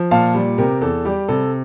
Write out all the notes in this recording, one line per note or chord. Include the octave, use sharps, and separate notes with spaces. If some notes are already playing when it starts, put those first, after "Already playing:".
Already playing: F3
A#2 F5 A5
G3
C3 G4 A#4
E2 A4
G3 G4
C3 A4